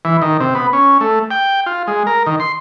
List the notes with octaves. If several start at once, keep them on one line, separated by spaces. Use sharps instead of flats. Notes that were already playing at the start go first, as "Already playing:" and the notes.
E3
D#3
C3
B3
C#4
A3
G5
F4
G#3
A#4
D#3
C6